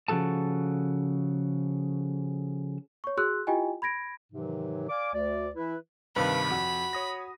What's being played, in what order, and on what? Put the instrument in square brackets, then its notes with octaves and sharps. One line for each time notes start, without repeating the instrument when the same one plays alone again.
[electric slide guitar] C#3 F3 F#4 A4 A5
[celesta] C#5 C#6
F#4 G#4 C6 E6 F#6
E4 F4 G4 D#5 G5 G#5
B5 G#6 A#6 D7
[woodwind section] G#2 C3 D#3 E3 F#3
D5 F5 G#5 D6
D2 D5
E3 E4 B4
[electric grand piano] G2 C3 D#3 [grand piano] B4 F5 A5 [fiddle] B5
[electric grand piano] F2 [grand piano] F#4
[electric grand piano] C#5 D#6 A#6